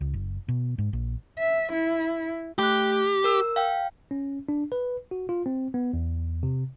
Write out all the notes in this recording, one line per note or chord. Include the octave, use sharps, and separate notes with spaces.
C#2
F#1
B2
G#2
A#1
E5
E4
A3 G4 F#6
A#4 E6
F5 G5
C#4
D4
B4
F#4
F4
C4
B3
E2
C3